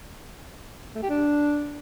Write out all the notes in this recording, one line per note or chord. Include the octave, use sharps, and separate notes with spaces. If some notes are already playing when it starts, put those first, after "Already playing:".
A3
G4
D4